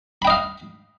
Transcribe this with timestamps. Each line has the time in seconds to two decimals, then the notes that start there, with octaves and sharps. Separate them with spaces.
0.22 B5
0.25 G5
0.27 D#5
0.30 F5